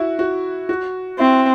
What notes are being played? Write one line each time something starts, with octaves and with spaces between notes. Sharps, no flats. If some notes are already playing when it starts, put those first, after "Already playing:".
Already playing: E4 F#4
F#4
F#4
C4 E4